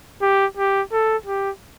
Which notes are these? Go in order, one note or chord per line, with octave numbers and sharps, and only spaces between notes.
G4
G4
A4
G4